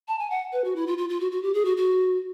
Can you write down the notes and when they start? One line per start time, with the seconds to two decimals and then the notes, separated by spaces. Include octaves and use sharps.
0.08 A5
0.19 G#5
0.30 F#5
0.52 B4
0.64 F#4
0.76 E4
0.87 F4
0.98 F4
1.09 F4
1.20 F#4
1.32 F#4
1.43 G4
1.54 G#4
1.65 F#4
1.77 F#4